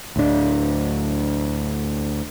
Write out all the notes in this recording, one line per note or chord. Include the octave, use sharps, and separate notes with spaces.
D2 A2 D4